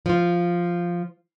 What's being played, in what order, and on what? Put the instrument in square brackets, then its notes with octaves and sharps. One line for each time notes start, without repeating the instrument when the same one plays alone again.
[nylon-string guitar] F3 F4